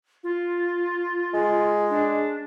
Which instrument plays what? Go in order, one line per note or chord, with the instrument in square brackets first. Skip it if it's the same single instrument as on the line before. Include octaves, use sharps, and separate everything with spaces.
[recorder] F4
[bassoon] G#3
[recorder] D4